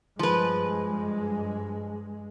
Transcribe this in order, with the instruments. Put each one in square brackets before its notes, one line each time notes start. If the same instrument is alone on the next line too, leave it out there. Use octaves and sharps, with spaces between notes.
[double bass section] G2 G#3 [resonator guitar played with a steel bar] F3 B4